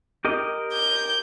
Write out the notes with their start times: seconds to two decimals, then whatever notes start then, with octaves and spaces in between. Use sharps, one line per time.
0.25 G4 A#4 D#5
0.74 G6